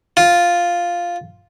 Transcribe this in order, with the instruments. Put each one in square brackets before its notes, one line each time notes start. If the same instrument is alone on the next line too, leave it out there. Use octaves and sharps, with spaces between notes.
[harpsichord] F4